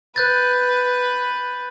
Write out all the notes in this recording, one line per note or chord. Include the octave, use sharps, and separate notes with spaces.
B4 F#6 G6 A6